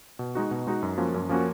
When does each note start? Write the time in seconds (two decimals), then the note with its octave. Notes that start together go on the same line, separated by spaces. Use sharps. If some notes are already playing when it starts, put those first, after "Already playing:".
0.19 B2
0.35 G#3 D#4 F#4
0.51 B2
0.67 G#3 D#4 F#4
0.82 F#2
0.98 F3 A#3 C#4 F#4
1.14 F#2
1.29 F3 A#3 C#4 F#4